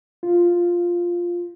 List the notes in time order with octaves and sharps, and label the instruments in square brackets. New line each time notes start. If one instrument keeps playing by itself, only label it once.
[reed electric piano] F4